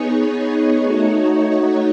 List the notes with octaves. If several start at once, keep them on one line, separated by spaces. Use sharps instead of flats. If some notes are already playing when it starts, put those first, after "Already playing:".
Already playing: B3 D#4 G#4 C#5
A3 D#4 F#4 C#5